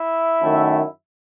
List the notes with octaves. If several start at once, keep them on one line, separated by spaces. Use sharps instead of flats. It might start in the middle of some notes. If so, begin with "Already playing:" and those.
Already playing: E4 E5
F#2 D#3 A3